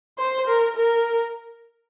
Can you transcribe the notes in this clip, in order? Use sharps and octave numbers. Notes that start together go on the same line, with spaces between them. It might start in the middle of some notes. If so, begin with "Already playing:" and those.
C5
A#4
A#4